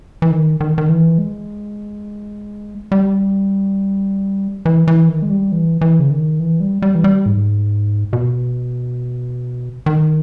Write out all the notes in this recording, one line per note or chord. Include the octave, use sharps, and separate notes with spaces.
E3
D#3
D#3
D#3
E3
G#3
G3
E3
E3
D#3
G#3
G3
E3
E3
C#3
D#3
E3
G3
G3
E3
G3
G#2
B2
D#3